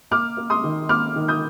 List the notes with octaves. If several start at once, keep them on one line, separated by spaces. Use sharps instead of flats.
A#3 D6 F6
A#3
C6 D#6
D#3
A#3 D6 F6
D#3
D#6 G6